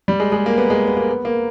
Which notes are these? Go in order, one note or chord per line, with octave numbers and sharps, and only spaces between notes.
G3
G#3
G#3
A#3
B3
G#3
B3
A#3
B3
A#3